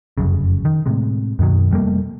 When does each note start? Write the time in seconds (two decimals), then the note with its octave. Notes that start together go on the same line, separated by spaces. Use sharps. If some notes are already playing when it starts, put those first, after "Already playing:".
0.18 F1 F#2 C#3
0.65 D#3
0.86 A2 C3 G#3
1.39 F#2 B2 D#3 F#3
1.71 F1 G3 A3 A#3